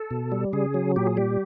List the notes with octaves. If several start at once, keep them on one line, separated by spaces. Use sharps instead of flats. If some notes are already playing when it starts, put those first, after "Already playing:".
Already playing: A4
B2
G3
C#3 G#4
F#3
A#2 G4
G#4
G3 G4